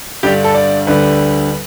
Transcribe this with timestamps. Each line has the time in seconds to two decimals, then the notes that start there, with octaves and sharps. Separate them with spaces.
0.23 G2 D3 G3 G4
0.44 A4
0.54 D5
0.87 D2 D3 G3 B4